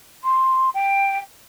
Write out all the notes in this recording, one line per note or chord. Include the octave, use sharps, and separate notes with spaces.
C6
G5